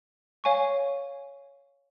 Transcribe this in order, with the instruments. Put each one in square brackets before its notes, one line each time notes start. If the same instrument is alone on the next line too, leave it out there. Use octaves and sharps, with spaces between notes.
[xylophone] C#5 F5 G#5 C#6